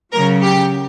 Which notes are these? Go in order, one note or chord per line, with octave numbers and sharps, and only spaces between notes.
C#3 F#3 A#4
G4